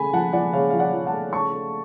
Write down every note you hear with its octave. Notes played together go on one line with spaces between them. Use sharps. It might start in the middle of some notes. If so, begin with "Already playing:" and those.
Already playing: C#3 A3 G#5 B5
F3 F#5 A5
F3 D5 F#5
C#3 C#5 F5
F3 F5
D5 F#5
F3
F#5 A5
A3
C#3 A5 C#6
A3